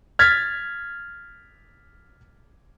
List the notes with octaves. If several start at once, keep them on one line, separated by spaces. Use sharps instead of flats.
F6 G#6 A6 B6